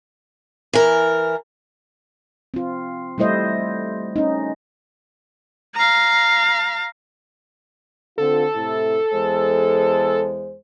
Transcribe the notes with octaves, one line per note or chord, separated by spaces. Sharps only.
E3 A#4
C4 F4
G3 A3 E4 C5 D#5
C#4 D#4
F5 A#5
D3 C4 F4 A4
A2 C3 E4
E2 G#3 C5